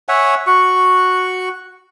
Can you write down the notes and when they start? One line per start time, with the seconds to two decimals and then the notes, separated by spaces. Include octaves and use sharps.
0.09 C#5 E5 F#5 G#5
0.47 F#4 C#6